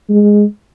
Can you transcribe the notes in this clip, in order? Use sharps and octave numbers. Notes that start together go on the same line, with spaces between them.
G#3